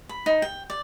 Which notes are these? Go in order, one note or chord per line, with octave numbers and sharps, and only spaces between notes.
B5
D#4
G5
D5